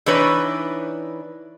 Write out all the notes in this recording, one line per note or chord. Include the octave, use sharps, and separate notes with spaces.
E3 D4 D#4 B4 C#5